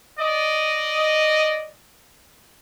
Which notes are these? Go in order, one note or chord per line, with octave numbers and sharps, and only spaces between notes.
D5 D#5